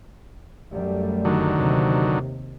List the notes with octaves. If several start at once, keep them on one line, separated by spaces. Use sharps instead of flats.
F#2 G3 A3
D3 D#3 F#3
D#2 C3